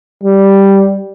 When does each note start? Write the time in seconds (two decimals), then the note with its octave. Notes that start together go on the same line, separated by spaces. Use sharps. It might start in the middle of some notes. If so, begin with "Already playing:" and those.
0.24 G3